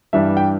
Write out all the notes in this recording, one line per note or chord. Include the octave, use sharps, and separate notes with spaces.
G2 E3 G3 D4 E5
G5